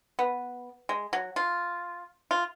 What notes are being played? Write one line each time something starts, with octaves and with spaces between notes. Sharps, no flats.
B3
G#3
F#3
F4
F4